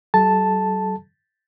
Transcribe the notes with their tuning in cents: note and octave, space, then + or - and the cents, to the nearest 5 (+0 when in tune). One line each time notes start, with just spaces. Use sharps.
F#3 +45 A4 -40 A5 +0